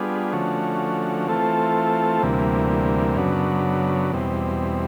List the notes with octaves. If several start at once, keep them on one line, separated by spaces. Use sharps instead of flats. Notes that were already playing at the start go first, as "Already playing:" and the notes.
Already playing: G3 B3 D4 F4 G#4
D3 F3 A3 C#4 F#4
E3 A3 C4 F4 A4
D2 C3 E3 G3 A#3
F#2 C#3 F#3 B3 D4
E2 B2 G3 C4